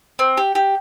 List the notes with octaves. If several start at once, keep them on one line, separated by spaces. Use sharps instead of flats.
C4
G4
G4